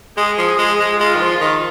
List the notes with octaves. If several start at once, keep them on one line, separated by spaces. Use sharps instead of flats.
G#3 G#4
F3
G#3
G#3
G#3 F4
D#3
F3
D#3